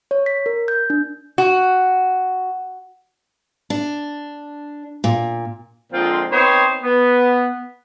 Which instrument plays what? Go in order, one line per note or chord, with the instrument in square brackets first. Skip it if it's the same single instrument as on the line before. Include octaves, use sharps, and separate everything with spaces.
[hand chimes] C#5
B6
A#4
G6
D4
[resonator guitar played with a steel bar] F#4
[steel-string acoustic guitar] D4
A#2
[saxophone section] A#2 D3 F3 G#3 C4 F4
B3 C4 D#4 C5 C#5
B3